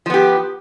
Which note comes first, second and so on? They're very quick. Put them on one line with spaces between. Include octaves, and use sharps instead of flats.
F3 B3 G4